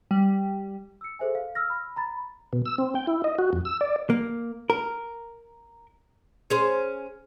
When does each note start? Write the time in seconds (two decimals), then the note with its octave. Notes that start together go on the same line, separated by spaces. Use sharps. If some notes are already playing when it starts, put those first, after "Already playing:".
0.11 G3
1.01 E6 C#7
1.19 G#4 A4 C5 E5 G#5
1.35 F5
1.55 E6 F6 A#6
1.70 B5
1.96 A#5 B5 A6
2.53 B2
2.65 E6
2.78 C4
2.95 G5
3.07 E4
3.24 D#5
3.38 F#4
3.53 F2
3.65 E6
3.81 D5
4.10 A#3
4.70 A#4
6.50 C#4 G#4 C5